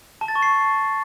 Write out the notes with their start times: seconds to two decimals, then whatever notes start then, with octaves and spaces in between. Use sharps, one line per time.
0.21 A5
0.28 A6
0.35 C#6
0.42 C7